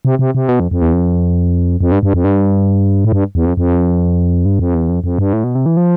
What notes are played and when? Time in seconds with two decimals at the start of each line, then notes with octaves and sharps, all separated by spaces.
0.05 C3
0.19 C3
0.35 C3
0.49 B2
0.60 F2
0.71 F2
0.82 E2
0.93 F2
1.81 F2
1.92 G2
2.03 G2
2.14 F2
2.24 G2
3.05 A2
3.12 G2
3.35 E2
3.46 F2
3.57 F2
4.45 G2
4.59 F2
4.74 E2
4.89 F2
5.04 F2
5.19 G2
5.33 A2
5.44 B2
5.55 C3
5.66 E3
5.77 F3